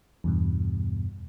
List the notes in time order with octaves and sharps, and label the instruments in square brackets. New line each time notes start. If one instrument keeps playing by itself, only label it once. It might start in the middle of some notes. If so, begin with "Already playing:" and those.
[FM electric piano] E2 G2 B2